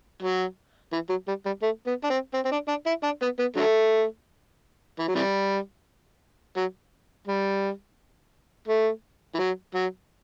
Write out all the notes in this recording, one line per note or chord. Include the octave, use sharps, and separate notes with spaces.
F#3
E3
F#3
G3
G3
A3
B3
D4
C4
C4
C4
D4
D4
E4
D4
B3
B3
D3 F#3 A3
E3
F#3
C3 E3 G3
F#3
G3
A3
E3
F#3
F#3